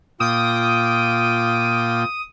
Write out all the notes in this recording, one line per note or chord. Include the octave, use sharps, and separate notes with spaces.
A#2 F4 G5 D6 D#6